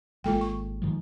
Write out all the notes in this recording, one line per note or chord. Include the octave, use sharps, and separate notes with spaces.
G#1 G#3 A#3 F4 A4 G5
C#6
G#2 D#3 F3